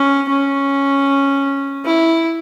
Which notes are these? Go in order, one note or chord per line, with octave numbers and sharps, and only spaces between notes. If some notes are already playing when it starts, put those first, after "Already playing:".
Already playing: C#4
C#4
E4